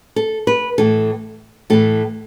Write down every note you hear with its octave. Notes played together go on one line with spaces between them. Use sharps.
A4
B4
A2 E3 A4
A2 E3 A4